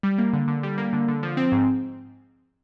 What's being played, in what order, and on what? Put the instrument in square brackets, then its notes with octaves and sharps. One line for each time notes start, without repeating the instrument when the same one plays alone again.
[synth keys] G3
A#3
D3
D3
G3
A#3
D3
D3
F3
C4
G#2